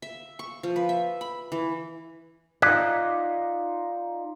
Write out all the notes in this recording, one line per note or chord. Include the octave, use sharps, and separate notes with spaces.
E5
C#6
F3
B4
E5
B5
E3
D#4 F4 D5 F#6 G#6 B6